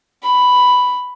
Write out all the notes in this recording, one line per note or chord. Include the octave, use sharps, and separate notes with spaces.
B5